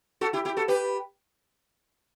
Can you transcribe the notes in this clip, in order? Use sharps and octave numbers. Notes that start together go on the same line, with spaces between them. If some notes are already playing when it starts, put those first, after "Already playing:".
F#4 A4
E4 G4
E4 G4
F#4 A4
G4 B4